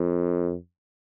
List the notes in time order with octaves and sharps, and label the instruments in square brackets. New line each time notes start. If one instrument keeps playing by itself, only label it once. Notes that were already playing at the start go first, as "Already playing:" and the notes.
Already playing: [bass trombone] F2